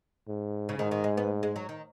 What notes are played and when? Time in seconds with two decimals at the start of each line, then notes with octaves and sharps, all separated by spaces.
0.28 G#2
0.69 C#3
0.78 G#2 D#3
0.91 D#3
1.04 G#3
1.17 B3
1.43 G#3
1.56 F#3
1.69 D#3